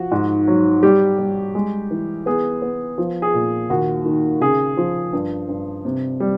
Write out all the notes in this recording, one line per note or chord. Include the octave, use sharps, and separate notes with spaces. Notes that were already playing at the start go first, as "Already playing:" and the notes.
Already playing: F3 F#4
G#2
F#3
G3 G4
G3
G#3
E3
B3 G#4
B3
F3
G#4
A#2
D#2 F#4
D#3
C#3 G#4
F3
G2
G2
C3
G3